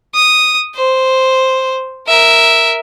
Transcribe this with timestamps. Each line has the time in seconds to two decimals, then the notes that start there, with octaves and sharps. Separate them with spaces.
0.15 D#6
0.75 C5
2.08 A#4 E5